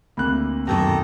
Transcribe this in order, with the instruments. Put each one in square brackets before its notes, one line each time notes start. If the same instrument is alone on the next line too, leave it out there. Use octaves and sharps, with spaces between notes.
[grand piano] D2 A#3 F#6 [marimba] C4 B5
[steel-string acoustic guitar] F#2 B2 D#3 [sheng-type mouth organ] G4 A4 A#5